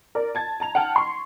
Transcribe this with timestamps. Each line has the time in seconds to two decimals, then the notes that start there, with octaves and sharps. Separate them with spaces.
0.15 A#4 D5
0.35 A5 G#6 A6
0.60 A5 A#5 F7
0.75 F#5 G5 A5 F6
0.96 C6 C#6